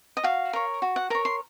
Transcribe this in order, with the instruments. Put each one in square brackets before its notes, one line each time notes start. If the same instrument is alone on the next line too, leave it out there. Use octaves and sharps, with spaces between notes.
[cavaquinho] D#5
F#4 F5
A#4 C#5
F#4
F#5
A#4 C#5 A#5
C6